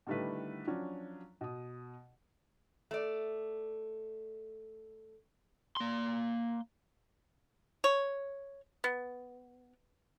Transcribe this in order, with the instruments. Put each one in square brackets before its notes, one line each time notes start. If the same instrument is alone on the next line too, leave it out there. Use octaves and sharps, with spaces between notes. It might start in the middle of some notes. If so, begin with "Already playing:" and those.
[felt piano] D3 D#3 G3 A3 E4 B4
F3 F#3 C#4 D4
B2 D#6
[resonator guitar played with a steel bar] A3 D5
[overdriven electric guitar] A#3 C6
[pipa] C#5
B3